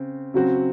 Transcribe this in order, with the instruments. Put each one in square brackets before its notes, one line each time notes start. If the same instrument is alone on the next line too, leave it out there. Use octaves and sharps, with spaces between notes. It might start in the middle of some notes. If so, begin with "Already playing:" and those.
Already playing: [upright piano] C#3 C4
C#3 F#3 C4 F#4